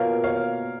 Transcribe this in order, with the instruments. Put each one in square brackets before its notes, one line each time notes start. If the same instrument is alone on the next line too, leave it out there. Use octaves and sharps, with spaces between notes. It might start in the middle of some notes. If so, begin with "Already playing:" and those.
Already playing: [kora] B2 A#3 F4 [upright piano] A#4 C#5
[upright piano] C#5 F5